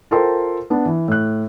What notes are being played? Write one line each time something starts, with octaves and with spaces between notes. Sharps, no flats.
F4 A4 A#4 C5 G5 C6
B3 D4
E3
A2 F#6